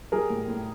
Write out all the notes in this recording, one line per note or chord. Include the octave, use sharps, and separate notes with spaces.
G3 G#4 A#4
A2
A2